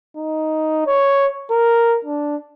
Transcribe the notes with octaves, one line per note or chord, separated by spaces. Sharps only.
D#4
C#5
A#4
D4